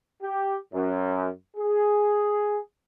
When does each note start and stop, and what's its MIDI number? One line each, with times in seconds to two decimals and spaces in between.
0.22 0.56 67
0.73 1.28 42
1.57 2.58 68